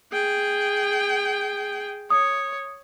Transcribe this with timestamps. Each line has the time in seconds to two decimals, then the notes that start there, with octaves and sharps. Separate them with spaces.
0.12 G#4 G5
2.10 C#5 D#6